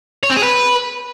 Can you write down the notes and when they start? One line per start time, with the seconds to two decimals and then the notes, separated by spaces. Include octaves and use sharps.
0.23 C#5
0.30 C4
0.36 G#4
0.43 B4